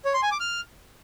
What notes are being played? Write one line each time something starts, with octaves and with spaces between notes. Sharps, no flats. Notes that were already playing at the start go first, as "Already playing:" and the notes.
C#5
C6
G#5
D6
F6